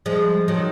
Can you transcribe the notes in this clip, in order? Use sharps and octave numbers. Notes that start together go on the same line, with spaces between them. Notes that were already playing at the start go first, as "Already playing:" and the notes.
F3 G#3
D#3 F#3